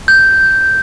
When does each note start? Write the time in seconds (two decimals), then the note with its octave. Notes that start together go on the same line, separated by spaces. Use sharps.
0.08 G6